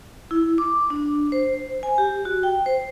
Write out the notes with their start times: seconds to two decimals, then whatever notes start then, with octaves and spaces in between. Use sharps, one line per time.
0.31 E4
0.58 D6
0.90 D4
1.32 C5
1.83 G#5
1.98 G4
2.25 F#4
2.43 G5
2.66 C5